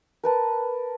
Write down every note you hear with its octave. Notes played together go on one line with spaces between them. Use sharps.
A#4 B4 A5